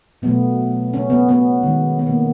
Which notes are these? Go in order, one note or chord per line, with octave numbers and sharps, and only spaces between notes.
B2 F#3 A3 B3
C#4
B3
B3
D#3 G#3
B3
A#3